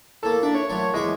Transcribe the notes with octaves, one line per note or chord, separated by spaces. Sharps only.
A2 A#3 A4
D4 E5
C#5
A#2 F#3 A3
E2 G#3 E5 D6